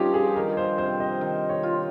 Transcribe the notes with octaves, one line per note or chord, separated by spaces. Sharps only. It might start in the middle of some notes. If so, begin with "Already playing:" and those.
Already playing: G2 F3 C#4 D#4 F4 G4
G#4
D#3 A#4
C5
C3 C5
D#5
D#3
C#5
F4